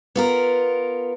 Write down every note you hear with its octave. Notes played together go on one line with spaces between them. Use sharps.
B3 F4 A#4